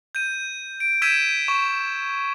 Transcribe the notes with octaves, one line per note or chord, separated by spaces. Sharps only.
G6 D#7
D7
E6 G6 G#6 B6 D#7 E7
C#6